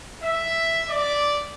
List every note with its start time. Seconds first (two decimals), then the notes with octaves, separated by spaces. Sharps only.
0.21 E5
0.89 D5